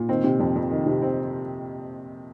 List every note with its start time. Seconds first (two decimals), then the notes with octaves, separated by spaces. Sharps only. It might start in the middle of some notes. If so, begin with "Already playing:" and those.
Already playing: A#2
0.09 D#3 C4
0.24 C3
0.40 F2
0.55 F2
0.71 D#3
0.86 C3
1.02 C4